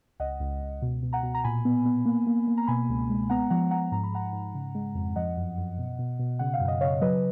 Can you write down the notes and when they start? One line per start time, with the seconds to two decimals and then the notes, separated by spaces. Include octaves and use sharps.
0.20 C#2 D#5 F#5
0.40 C#2
0.61 C#2
0.82 B2
1.03 B2
1.13 F#5 A#5
1.23 B2
1.35 A#5
1.44 A#2 G#5 B5
1.65 B3
1.85 B3
2.05 A#3
2.27 A#3
2.47 A#3
2.57 A#5
2.67 B2 G#5 B5
2.89 C#2
3.09 G#3
3.30 B3 F#5 A#5
3.50 F3 F#5 A#5
3.71 F3 F#5 A#5
3.92 G#2 A#5
4.04 B5
4.12 G#2 F#5 A#5
4.33 G#2
4.54 C#3
4.75 G#3
4.95 F2
5.16 F3 D#5 F#5
5.37 F#2
5.58 F#2
5.78 B2
5.99 B2
6.19 B2
6.39 C#3 F#5
6.54 F5
6.60 F#2
6.68 D#5
6.81 C#3 C#5 F5
7.01 F#3 B4 D#5